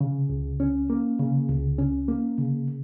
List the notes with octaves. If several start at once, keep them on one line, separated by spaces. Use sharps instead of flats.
C#3
C#2
C#4
A#3
C#3
C#2
C#4
A#3
C#3